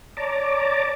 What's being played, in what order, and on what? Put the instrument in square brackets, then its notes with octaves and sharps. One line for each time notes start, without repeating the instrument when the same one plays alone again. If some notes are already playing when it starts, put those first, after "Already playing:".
[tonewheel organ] C#5 D5 A5 A#5 D6